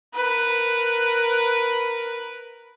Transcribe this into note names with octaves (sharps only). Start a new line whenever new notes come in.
A#4 B4